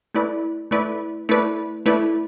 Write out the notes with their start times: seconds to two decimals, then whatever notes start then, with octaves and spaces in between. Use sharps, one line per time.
0.14 A3 E4 B4 D5
0.71 A3 E4 B4 D5
1.29 A3 E4 B4 D5
1.86 A3 E4 B4 D5